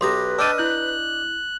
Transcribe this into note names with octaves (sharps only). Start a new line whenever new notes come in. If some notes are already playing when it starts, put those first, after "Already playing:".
B1 G4 B4 A#5 C6 D#6 A#6
D4 D5 D#5 G5 A5 E6 F6 D#7
E4 F#6 G6